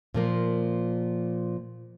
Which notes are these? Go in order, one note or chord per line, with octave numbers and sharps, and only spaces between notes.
A#2 F3 A#3